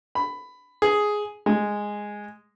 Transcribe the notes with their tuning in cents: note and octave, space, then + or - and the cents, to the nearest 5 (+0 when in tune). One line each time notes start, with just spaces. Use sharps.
B5 +15
G#4 +5
G#3 -5